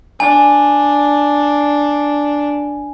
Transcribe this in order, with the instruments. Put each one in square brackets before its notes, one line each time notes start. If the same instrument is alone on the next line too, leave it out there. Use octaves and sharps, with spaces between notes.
[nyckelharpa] D4 [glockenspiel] G#5